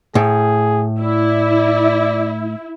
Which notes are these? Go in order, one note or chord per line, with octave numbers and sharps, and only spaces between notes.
A2 G#4
E4 D5